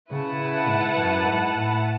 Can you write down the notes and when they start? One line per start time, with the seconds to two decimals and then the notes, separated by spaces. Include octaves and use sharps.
0.11 C#3 E4 B4 F#5 A5
0.40 C#3
0.68 G#2
0.97 F#2
1.26 G#2
1.54 A2